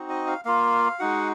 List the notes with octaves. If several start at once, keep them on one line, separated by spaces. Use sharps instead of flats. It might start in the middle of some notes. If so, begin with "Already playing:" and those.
Already playing: C4 D#4 F#4
D#5
F5
A#3 F4 F5
G#3 D#4 F#4 F#5